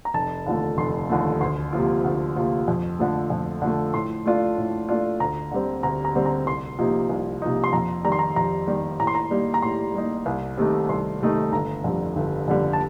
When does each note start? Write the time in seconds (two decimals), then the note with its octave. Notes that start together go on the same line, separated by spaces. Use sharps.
0.05 A#5
0.14 F1 A5
0.46 D#2 D3 F3 A3
0.78 F1 C6
1.09 D#2 D3 F3 A3
1.41 D2 C6
1.73 C3 F3 A#3 F4
2.04 D2
2.36 C3 F3 A#3 F4
2.68 F2
2.99 D3 F3 A3
3.30 F2
3.62 D3 F3 A3
3.93 A2 C6
4.25 A3 D4 F4
4.57 A2
4.89 A3 D4 F4
5.20 D2 A#5
5.51 D3 G3 C4
5.83 D2 A#5
6.05 A#5
6.15 D3 G3 C4
6.26 A#5
6.47 C2 C6
6.79 C3 F3 A#3 D#4
7.09 C2
7.42 C3 F3 A#3 D#4
7.64 C6
7.73 F2 A#5
8.05 D#3 G3 A#5
8.12 C6
8.19 A#5
8.36 F2 A#5
8.67 D#3 G3
9.00 A2 A#5
9.07 C6
9.15 A#5
9.31 G3 A#3 D#4
9.54 A#5
9.62 A2 C6
9.94 G3 A#3 D#4
10.26 C2
10.57 C3 D#3 A3 D#4
10.89 C2 C6
11.20 C3 D#3 A3 D#4
11.52 G1 A#5
11.84 F2 D3 G3
12.16 G1
12.48 F2 D3 G3
12.73 A5